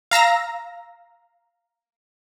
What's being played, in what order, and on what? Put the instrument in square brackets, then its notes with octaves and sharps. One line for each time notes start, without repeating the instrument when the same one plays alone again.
[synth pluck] F5 A#5 E6 A#6